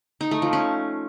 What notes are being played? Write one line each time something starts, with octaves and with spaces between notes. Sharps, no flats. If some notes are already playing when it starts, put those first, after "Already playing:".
D#4
A3
F3
C#4